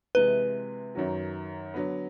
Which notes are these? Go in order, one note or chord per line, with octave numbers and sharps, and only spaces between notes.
C3 E3 G#3 B4
F#2 D#3 F#3
D3 F#3 B3